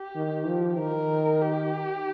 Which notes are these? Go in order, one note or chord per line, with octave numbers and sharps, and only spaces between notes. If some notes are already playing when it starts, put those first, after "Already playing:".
Already playing: G4
D#3
F3
D#3 A#4
G4